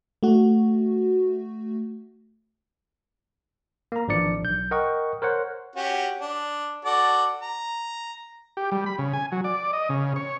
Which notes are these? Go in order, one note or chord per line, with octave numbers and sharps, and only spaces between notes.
A3 F#4
A#3 A#5
G#1 E3 F3 D4 D5 C#7
B1 G6
A#4 D#5 F#5 G5 C#6
A#4 C5 C#5 F#5
C#4 F#4 G4
D4
F#4 A4 D5
A#5
G4
G3
B5
C#3
G#5
F#3
D5
D#5
C#3
C#5